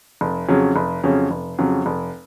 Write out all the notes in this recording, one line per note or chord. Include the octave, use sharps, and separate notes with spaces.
F1
F2 C#3 F#3 C#4
F1
F2 C#3 F#3 C#4
F1
F2 C#3 F#3 C#4
F1